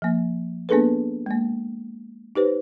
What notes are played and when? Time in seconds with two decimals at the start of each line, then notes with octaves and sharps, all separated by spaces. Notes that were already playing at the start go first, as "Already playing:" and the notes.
0.02 F3 A#3
0.69 A#3 B3 D4 G#4 A4 B4
1.26 G#3 A#3
2.36 D#4 G4 B4 C5